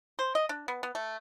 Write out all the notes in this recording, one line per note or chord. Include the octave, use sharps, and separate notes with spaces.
C5
D#5
D4
B3
B3
A3